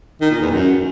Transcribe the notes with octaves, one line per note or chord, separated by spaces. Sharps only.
D#3
A#2
E2
F#2